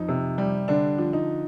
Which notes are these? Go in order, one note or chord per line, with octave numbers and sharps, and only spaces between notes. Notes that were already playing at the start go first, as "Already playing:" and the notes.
Already playing: F2 D#4
C3
G3
D3 D4
F3
D#4